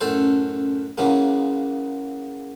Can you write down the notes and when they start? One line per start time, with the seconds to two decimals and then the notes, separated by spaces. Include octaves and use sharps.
0.01 A1 F#2 A3 A4 C5
0.98 C#3 E3 F#3 G#3 A#3